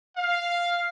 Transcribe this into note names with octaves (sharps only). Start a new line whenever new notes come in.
F5